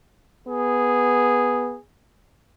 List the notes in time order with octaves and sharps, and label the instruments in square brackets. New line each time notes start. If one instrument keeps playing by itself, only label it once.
[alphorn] B3 [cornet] G#4